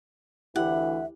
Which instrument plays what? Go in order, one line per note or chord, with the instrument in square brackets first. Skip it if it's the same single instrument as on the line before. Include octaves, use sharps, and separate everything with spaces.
[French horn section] D2 E3 [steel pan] E4 G4 [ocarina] E5 [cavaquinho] F#5